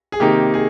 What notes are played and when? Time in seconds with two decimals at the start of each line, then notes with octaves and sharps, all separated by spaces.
0.12 G#4
0.20 C3 D#3 A#3 D#4 G4
0.54 G#4